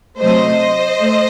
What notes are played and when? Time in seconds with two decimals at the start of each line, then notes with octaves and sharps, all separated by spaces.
0.21 C3 F#3 A3 C5 D#5
0.99 A3